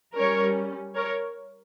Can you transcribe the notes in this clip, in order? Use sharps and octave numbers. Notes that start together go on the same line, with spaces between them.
G3 C#4 A#4 C#5
A#4 C#5